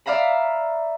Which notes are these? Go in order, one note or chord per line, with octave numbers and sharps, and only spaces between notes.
D5 E5 F5 A#5 B5